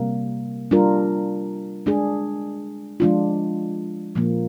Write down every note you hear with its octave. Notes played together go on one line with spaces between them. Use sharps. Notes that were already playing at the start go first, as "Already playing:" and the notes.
Already playing: C3 G3 A#3
G3 D4 F4 A#4
G#3 D4 G#4
F3 G#3 D4 F4
A#2 F3 A#3